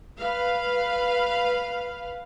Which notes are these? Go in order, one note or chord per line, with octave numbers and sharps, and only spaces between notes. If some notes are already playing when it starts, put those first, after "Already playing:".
B4 F5